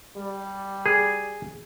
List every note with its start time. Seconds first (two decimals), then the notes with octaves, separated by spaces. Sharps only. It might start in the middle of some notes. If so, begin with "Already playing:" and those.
0.17 G3
0.86 G#4